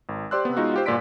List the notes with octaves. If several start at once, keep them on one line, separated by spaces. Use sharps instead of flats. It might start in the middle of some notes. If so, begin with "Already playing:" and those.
G#1
G4 C5 D5 C6 E6 F#6
C3 B3
G#3 B3 D#4 F4 F#4
F4 G4 C5
G1 A#2 D5 C6 B6 D7